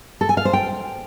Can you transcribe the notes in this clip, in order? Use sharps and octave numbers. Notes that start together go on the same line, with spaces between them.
A4
G#5
F5
C5
G5